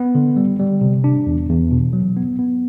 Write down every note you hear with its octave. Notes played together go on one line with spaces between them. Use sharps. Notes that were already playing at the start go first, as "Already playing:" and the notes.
Already playing: B3
D3
G3
G3
C3
D4
E2
E2
B2
F#3
B3
B3